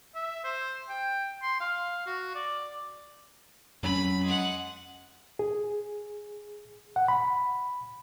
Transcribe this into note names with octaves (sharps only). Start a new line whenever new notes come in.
E5
C5
G5
C6
F5
F#4
D5
F2 F#3 C#4 B5
G#3 F#5
G#4
F#5
B5